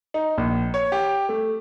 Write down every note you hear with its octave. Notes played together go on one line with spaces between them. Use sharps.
D#4
A#1
C#5
G4
A3